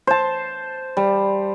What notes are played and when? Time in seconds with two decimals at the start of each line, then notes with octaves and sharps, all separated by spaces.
0.07 C5 A5
0.97 G3